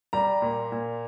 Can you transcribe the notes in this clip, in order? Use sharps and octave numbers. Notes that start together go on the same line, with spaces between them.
G3 A#5
A#2
A#2